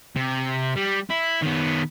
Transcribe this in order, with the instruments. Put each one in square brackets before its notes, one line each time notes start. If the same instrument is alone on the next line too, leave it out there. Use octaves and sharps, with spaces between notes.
[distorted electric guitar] C3
G3
E4
D#3 B3